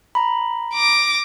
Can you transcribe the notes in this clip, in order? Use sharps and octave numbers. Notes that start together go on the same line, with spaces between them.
A#5 B5
D6 A#6